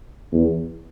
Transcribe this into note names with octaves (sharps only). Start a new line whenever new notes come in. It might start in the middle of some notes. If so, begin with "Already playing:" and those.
E2